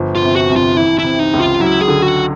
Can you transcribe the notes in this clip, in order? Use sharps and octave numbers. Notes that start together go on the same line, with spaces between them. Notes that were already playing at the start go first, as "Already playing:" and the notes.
Already playing: G1 F3
F4
C3
F#4
C2
F4
E3 E4
E4
C3
D#4
C#2
F4
F#3 E4
G#4
D3
F#4